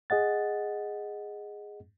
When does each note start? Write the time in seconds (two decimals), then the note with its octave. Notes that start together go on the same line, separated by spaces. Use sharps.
0.10 G#4 D#5 F#5 A6